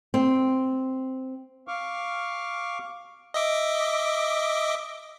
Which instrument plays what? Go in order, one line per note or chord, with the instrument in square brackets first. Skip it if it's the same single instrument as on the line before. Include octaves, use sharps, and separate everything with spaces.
[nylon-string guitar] C4
[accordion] F5 C#6 D6 F6
[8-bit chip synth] D#5 E5 D6